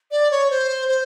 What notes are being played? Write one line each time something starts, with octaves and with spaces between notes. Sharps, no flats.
D5
C#5
C5
C5